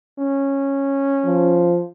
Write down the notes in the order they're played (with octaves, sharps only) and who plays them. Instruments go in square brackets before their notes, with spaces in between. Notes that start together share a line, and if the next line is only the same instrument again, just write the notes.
[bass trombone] C#4
[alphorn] F3